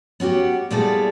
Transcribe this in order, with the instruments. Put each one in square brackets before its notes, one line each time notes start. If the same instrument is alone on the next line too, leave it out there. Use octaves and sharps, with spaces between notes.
[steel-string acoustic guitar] B3 C#4 F#4 G4
A#2 G3 B3 E4 G#4 A4